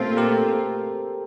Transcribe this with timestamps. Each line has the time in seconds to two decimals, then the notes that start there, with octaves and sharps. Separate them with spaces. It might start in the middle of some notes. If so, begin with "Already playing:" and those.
Already playing: A#2 A3 C4 F4 G4 A4 A#4 C5
0.17 G4 A#4